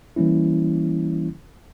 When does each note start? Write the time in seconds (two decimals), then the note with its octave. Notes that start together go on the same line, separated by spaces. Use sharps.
0.16 E3 G3 A#3 C#4 E4